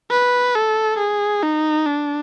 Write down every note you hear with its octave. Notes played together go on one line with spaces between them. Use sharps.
B4
A4
G#4
D#4
D4